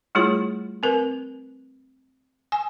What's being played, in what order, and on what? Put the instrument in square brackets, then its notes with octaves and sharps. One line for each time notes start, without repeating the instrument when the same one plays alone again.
[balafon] G3 A3 E4 F4 G#4 C#5
C4 A#4 B4
G#5